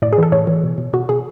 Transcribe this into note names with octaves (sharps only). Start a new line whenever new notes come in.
A2 D5
G#4
E3 A4
A2 C#5
E3
B2
B2
B2 F#4
B2 G#4